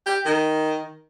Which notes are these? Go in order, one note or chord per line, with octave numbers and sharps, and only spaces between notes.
G4
D#3